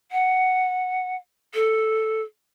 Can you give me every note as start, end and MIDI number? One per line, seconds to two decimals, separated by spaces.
0.11 1.15 78
1.54 2.22 69